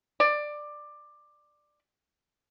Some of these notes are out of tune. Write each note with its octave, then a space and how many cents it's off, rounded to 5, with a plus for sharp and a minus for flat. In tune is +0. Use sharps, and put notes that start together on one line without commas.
D5 +15